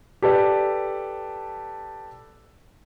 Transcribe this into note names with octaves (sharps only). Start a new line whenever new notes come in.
G4 A4 B4 D5